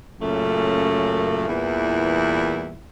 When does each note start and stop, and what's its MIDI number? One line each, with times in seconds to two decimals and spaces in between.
0.20 1.44 42
0.20 1.44 46
0.20 1.44 49
0.20 1.44 57
1.48 2.78 40
1.48 2.78 46
1.48 2.78 52
1.48 2.78 55
1.48 2.78 64